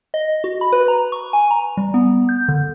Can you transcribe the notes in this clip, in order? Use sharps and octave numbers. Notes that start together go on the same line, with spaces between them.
D#5
F#4
B5
B4
A#5
C#6
G#5
A#5
G3
B3
G6
D3